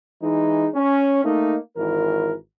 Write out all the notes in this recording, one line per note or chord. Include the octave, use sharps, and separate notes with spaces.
E3 G#3 D#4
C#4
A3 A#3 D#4
G#1 E3 A#4